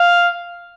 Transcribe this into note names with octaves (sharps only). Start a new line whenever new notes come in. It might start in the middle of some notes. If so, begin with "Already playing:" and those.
Already playing: F5